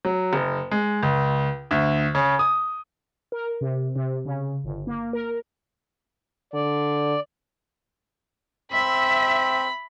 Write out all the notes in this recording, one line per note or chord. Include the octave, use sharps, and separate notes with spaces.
F#3
F#1
G#3
C#2
D2
C#3
D#6
A#4
C3
C3
C#3
G1
A#3
A#4
D3 D5
C4 E5 B5